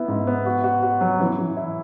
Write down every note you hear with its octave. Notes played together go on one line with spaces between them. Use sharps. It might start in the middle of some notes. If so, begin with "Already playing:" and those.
Already playing: B3 E4
G#2
B3
F#4
F#4
F#4
F#3
E3
E3
E4